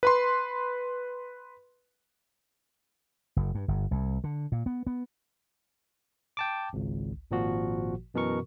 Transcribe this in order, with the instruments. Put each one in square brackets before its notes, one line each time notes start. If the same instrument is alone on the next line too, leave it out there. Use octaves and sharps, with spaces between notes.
[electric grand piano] B4 B5 C6
[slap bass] F#1
G2
G1
C2
D3
A#2
B3
B3
[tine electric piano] G5 A5 D6
G#1 C#2
G#1 A#2 F3 F#4
F#2 B2 E3 A#4 C#6